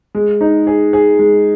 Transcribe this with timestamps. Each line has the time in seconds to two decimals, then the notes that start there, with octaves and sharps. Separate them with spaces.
0.15 G#3
0.41 D#4
0.67 G#4
0.93 G#4
1.19 G#3